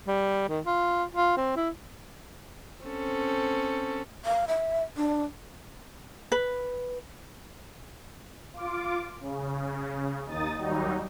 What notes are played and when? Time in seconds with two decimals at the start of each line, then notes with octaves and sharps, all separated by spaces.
0.07 G3
0.49 D#3
0.66 F4
1.15 F4
1.37 C4
1.56 E4
2.84 C4 C#4 A4
4.25 F5
4.48 E5
4.97 D4
6.32 B4
8.54 F4 D6
9.19 C#3
10.26 D#2 D#4 D#6 A6
10.58 D#2 F#3 G3 D#4